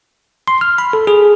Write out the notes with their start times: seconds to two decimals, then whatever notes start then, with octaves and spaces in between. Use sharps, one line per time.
0.48 C6
0.61 F6
0.78 B5
0.93 A4
1.07 G#4